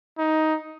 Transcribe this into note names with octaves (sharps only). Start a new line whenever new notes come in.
D#4